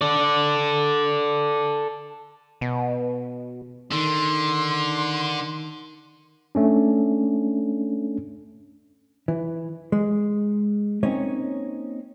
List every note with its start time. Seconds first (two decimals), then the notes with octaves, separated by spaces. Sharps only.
0.01 A4 D5
2.61 B2
3.92 D3 D#3 C6
6.55 A3 C#4 D4
9.28 E3
9.92 G#3
11.03 A#3 C4 C#4 D#4 C#5 D#5